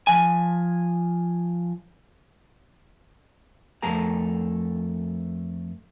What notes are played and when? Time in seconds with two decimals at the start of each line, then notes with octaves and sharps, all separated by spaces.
0.07 F3 G#5
3.82 F2 A3 A#4 A5 A#5